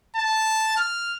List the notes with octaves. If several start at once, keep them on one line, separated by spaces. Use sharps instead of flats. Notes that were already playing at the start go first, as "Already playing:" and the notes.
A5
F6